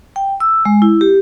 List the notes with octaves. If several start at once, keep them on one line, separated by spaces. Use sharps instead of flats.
G5
E6
G#3
E4
G4